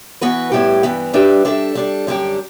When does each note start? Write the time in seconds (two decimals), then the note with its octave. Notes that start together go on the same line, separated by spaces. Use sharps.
0.21 E3 B3 F#4 B4
0.52 A2 G3 B3 E4 G4
0.83 G2 E3 B3
1.13 G3 D4 G4 B4 E5
1.45 G3 D4 A4 E5
1.75 G3 D4 A4
2.07 F#2 D3 G3 D4 G4